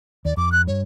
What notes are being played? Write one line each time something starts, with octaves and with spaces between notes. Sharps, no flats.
D#2 D5
F2 D6
F#6
G2 C#5